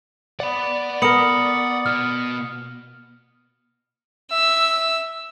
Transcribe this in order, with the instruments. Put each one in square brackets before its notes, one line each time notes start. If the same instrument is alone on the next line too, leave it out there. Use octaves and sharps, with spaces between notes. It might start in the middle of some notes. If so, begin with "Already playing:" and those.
[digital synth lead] D5 [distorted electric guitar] F#5 B5
[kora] B3 A#4 [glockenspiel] D#6 C#7 F#7
[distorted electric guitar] B2 [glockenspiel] F6
[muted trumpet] E5 [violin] E6